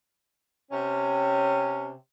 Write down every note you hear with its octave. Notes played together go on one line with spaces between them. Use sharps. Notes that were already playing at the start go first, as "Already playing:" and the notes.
C3 C#4